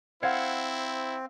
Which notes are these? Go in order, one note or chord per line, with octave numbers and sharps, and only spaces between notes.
C4 E4 C5 F5 F#5 G#6